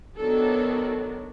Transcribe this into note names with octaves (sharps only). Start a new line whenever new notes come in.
D#3 F#3 B3 D4 A4